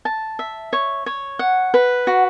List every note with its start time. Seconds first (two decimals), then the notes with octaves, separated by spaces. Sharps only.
0.05 A5
0.39 E5
0.73 C#5
1.06 C#5
1.39 F#5
1.74 B4
2.07 F#4